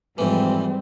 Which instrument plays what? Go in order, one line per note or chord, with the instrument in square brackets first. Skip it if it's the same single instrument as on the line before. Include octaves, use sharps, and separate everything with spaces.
[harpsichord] F2 E3 [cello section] G#2 G3 [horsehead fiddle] C4